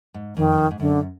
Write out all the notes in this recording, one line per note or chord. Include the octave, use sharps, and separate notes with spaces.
G#2
F2 D#3
F2
G#2
F#2 D3